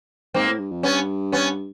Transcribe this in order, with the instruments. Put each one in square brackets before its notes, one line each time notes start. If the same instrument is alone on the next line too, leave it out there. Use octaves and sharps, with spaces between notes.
[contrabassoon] G#2 [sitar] A#3 C4
[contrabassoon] A2
G2
F2
[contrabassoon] G2 [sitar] B3 C#4
[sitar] B3 C#4